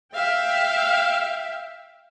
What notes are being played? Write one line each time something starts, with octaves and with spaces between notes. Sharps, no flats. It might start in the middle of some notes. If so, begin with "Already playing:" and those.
E5 F5 G5